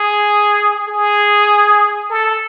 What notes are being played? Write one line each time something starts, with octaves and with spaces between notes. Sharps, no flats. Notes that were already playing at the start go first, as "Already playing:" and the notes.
Already playing: G#4
G#4
A4